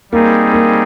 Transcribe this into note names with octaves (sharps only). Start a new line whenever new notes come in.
G3 A#3 C4 D#4 G#4
A#3